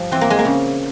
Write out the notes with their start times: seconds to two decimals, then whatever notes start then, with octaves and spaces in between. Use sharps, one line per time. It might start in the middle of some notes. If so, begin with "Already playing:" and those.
Already playing: G2 F3
0.11 E3 C4
0.21 A#3
0.30 G#3
0.39 A#3
0.45 C#3